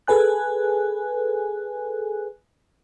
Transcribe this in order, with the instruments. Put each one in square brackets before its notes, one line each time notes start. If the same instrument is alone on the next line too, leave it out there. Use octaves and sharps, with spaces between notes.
[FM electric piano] G#4 A4 B4 G#5 F#6